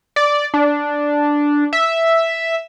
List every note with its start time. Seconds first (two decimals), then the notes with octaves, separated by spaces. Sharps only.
0.16 D5
0.54 D4
1.73 E5